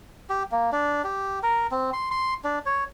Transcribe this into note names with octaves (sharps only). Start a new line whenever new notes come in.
G4
A#3
D4
G4
A#4
C4
C6
C6
D4
C#5